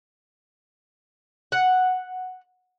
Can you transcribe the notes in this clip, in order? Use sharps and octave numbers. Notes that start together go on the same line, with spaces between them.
F#5